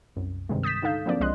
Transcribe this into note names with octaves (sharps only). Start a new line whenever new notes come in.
C2 F#2
G2 C3 D#3 G3 G#3
D#6 G6 A6 B6 E7
D3 D#4 A4 F5 G6
F3 F#3 A#3 C4 D4 D5
C2 F3 G#3 D#5 C6 F#6